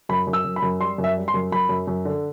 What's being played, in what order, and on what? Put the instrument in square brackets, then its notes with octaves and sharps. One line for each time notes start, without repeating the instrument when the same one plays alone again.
[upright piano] F#2 B5
F#2
E6
F#2
B5
F#2
G3 C6
F#2
E5
G3
C6
F#2
F#2 B5
F#2
F#2
D3